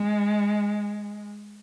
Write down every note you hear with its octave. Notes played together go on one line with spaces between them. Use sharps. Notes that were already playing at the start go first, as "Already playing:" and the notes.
Already playing: G#3